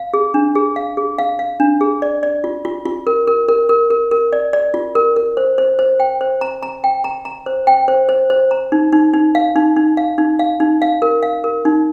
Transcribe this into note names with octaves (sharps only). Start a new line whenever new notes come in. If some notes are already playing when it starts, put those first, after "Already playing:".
Already playing: F5
G#4
D4
G#4
F5
G#4
F5
F5
D4
G#4
D5
D5
F4
F4
F4
A#4
A#4
A#4
A#4
A#4
A#4
D5
D5
F4
A#4
A#4
C5
C5
C5
G5
C5
A#5
A#5
G5
A#5
A#5
C5
G5
C5
C5
C5
A#5
D#4
D#4
D#4
F5
D#4
D#4
F5
D#4
F5
D#4
F5
A#4
F5
A#4
D#4